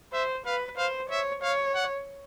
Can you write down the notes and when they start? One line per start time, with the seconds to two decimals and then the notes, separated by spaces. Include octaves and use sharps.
0.13 C5 E5
0.46 B4 F5
0.77 C5 F5
1.10 C#5 E5
1.43 C#5 F5
1.75 F#5